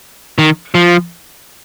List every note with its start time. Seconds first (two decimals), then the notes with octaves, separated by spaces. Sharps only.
0.38 D#3
0.75 F3